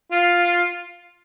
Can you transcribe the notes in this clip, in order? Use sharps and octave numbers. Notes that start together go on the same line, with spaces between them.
F4